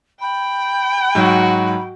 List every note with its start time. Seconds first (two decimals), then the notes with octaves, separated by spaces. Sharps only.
0.21 G5 B5
1.15 G#2 F#3 F#4